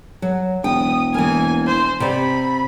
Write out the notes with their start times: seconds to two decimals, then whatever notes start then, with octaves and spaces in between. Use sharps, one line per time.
0.22 F#3
0.64 E1 G5 D#6
1.14 E3 A#3 G#5
1.67 C5
2.00 C3 D5 B5